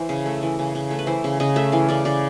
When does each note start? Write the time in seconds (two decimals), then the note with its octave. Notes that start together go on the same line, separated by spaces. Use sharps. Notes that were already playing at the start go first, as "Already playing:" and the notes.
Already playing: E3 C5
0.09 C#3
0.26 A3
0.43 E3
0.59 C#3
0.75 C#3
0.91 A3
0.99 B4
1.07 E3 C5
1.24 C#3
1.40 C#3 D#5
1.56 A3 E5
1.72 E3 F5
1.89 C#3 D5
2.05 C#3 D5